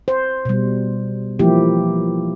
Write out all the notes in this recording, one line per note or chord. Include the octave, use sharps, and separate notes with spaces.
C5
B2 G3
E3 F3 A#3 E4 G4